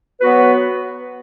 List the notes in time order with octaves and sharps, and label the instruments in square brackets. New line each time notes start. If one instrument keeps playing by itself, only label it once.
[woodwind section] F#3 B3 F#4 B4